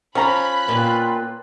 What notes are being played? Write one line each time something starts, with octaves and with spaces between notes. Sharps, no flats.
F3 C#4 A#5 B5 F#6
A#2 F4 B4 G5